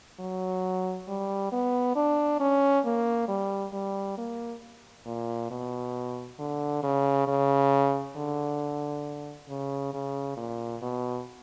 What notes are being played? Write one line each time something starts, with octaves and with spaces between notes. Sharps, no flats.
F#3
G3
B3
D4
C#4
A#3
G3
G3
A#3
A#2
B2
D3
C#3
C#3
D3
C#3
C#3
A#2
B2